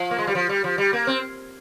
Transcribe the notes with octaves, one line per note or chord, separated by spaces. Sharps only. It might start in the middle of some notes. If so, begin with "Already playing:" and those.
Already playing: F3
A#3
G#3
G3
F3
G3
F3
G3
A#3
C4